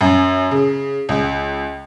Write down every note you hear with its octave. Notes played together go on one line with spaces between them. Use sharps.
F#2
C#3
C#2